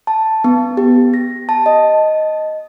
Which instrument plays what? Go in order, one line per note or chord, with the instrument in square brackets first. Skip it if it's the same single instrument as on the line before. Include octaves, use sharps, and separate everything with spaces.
[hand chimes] A5
B3
G4
A#6
A5
D#5